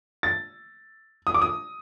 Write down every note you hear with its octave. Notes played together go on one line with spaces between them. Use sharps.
A6
D#6
D6
D#6